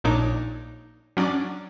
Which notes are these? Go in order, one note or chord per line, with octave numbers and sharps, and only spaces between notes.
A#1 A#2 D4 D#4 C#5 D6
F#3 C#4 D4 D5 D6